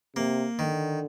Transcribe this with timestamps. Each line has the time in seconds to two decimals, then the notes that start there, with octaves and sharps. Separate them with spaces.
0.16 C3 A#3
0.58 D3 D#3